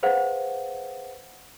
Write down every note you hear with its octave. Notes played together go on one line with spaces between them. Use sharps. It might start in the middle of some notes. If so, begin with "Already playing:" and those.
G#4 B4 C5 F5 F#5